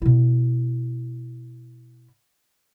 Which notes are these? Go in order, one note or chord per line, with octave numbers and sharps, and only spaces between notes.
B2 E4